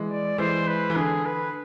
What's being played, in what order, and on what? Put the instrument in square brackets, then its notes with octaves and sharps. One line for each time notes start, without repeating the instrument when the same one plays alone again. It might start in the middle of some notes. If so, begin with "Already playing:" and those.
Already playing: [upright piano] E3 G#3
[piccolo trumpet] D5
[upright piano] E3 G#3 [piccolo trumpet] C5
[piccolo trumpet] B4
[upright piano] E3
[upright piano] D3 [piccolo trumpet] G#4
[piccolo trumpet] B4